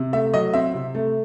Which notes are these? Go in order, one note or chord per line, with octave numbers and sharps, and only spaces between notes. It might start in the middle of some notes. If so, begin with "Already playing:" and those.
Already playing: C3
A3 E5
F#3 D#5
C4 E5
C3
A3